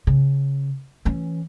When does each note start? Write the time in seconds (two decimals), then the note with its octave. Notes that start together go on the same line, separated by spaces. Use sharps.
0.07 C#3
1.05 E3 C#4